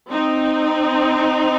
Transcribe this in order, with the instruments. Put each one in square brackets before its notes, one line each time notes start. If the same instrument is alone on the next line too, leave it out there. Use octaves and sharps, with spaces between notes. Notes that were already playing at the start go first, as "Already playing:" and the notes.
[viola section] C4 D#4